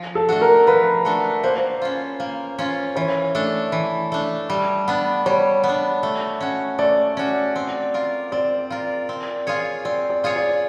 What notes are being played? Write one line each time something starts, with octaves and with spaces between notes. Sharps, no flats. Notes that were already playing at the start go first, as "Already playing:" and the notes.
Already playing: F3
A4
A3 D4 F#4
A#4
F3 B4
A3 D4 F#4
A#3 C5
C#4 F4
A#3
C#4 F4
E3 C#5
A3 D4
E3
A3 D4
G3
B3 D4
G3 C#5
B3
D4
A3
C#4 F#4
A3 D5
C#4 F#4
C4
F4 A#4
C4 D5
F4 A#4
C4
F4 G#4 C#5
C4 D5
D5
F4 G#4 C#5
D5